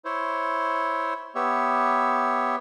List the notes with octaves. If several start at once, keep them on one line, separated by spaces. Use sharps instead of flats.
E4 C5 C#5
B3 G4 C#5 E5